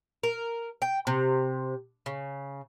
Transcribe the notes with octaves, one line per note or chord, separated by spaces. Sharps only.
A#4
G5
C3
C#3